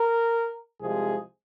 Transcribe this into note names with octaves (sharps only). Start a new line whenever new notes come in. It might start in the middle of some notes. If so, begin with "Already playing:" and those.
Already playing: A#4
C2 C3 F3 G#3 G#4